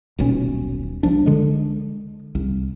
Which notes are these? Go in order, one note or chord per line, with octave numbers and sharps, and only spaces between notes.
D#1 B1 C#4
C2 F3 D4
D3 G#3
C2